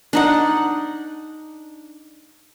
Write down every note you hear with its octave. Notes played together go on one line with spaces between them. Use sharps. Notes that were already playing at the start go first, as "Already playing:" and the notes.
D4 D#4 F#5